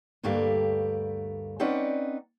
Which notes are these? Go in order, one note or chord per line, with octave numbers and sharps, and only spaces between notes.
D2 G2 A3 A#3 G4 B4
C4 C#4 D#4 B4 D5 F#5